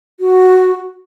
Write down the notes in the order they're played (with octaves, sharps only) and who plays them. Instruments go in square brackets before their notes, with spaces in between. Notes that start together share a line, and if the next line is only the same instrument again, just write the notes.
[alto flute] F#4